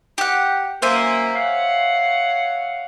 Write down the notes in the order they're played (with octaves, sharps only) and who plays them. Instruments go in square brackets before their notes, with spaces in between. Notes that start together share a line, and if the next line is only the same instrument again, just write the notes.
[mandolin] G4 F#5
[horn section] F#2 A#3 [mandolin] C5 E5 G#5
[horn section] C#5 F5 F#5